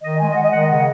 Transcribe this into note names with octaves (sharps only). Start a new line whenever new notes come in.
D#3 D#5
G#3 G#5
D#5
D#3 F#5
D#5
D#3 F#5
D#5
C#3 F#5